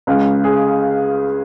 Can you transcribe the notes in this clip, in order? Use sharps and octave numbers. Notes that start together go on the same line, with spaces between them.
C#2 C#3 G#3
G#4